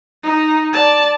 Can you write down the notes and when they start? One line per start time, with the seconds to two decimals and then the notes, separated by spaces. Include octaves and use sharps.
0.23 D#4
0.73 D5 A5